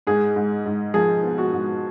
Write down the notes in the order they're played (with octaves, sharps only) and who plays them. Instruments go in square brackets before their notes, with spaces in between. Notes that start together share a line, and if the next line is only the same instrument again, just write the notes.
[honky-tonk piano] G#2 [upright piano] G#4
[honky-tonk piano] G#2
G#2
[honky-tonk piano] F3 [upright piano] G#4
[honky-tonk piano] B3
[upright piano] F#4
[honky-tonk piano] G#2